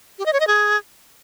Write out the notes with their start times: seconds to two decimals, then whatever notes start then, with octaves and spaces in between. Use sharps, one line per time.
0.19 G4
0.26 D#5
0.33 C#5
0.40 D#5
0.47 G#4